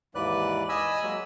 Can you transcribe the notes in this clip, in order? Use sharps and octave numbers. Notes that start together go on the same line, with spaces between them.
D#2 G#2 E3 B4 D5 F#6
D#5 G#5 B5 E6
F#3 G#3 A#3